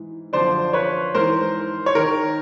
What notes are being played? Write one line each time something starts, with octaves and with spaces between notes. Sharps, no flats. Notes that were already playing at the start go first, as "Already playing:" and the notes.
Already playing: G#2 E3
F#2 D3 F3 C5 D5
B4 C#5
G#2 E3 A#4 C5
C#5
D#3 A#4